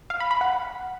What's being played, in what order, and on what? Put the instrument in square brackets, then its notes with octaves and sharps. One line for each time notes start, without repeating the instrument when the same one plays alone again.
[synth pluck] F5
B5
B5
F#5